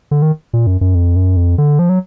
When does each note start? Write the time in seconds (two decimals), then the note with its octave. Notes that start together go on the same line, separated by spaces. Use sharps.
0.11 D3
0.22 D#3
0.53 A#2
0.67 F#2
0.81 F#2
0.95 F2
1.16 F#2
1.37 F2
1.58 D3
1.79 F3
1.89 F#3